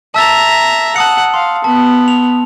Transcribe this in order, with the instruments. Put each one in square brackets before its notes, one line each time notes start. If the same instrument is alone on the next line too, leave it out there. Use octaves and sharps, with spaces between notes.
[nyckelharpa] E5 A#5 [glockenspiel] A5 E6 A6
[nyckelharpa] F#5 [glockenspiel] A5 D#6 C#7
[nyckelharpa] F5 [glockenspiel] C6
[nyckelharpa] B3 [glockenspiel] A5
[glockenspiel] F7